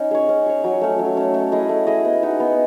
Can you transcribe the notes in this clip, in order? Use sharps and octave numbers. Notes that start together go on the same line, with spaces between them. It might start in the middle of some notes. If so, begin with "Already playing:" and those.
Already playing: C#4 D#4
G#4 C#5
C#4
G#4 C#5
F#3
A3 C#4
F#3
A3 C#4
A3
E4 G#4 D#5
A3
E4 G#4 D#5
B3
D#4 F#4
B3